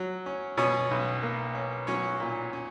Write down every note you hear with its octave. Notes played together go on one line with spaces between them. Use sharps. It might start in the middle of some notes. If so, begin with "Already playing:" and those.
Already playing: F#3
C#4
B2 C#4 C#5
B1
A#3
C#4
F#3 C#4 C#5
A#2
C#4